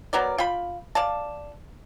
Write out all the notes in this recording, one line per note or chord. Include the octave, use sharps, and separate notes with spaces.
F#3 B3 A#4 D5
F4 G5 B5
D5 F5 A5